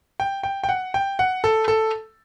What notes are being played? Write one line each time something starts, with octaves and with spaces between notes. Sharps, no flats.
G5
G5
G5
F#5
G5
F#5
A4
A4